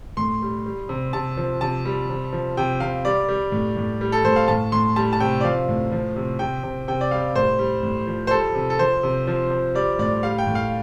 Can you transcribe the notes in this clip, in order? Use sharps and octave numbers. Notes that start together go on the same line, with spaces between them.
A2 C6
G3
G3
C3
C3 A5
F3
C3 A5
G3
C3
F3
C3 G5
C3 F5
G3 D5
G3
A2
A2
G3
A4
A2 C5
F5
A2 A5
A2 C6
G3 A5
A5
C3 G5
D5
F3 F5
A2
F3
C3
C3 G5
C3
C3 G5
D5
G3 F5
A2 C5
G3
A2
F3
C5
G3 A4
C3
A4
F3 C5
C3
F3
F3
G3 D5
A2 D5
G3 F5
G5
A2
F5